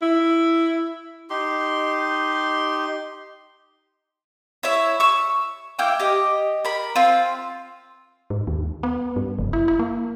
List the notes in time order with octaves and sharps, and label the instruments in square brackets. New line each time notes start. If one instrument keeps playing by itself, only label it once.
[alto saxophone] E4
[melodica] D#4 G4 C6
[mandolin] E4 C#5 E5
C#6 E6
A#3 E4 G5 D6
G4 D#5
A#4 B5
C4 F4
[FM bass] G#2
D#2
B3
G2
F#1
E4
E4
A#3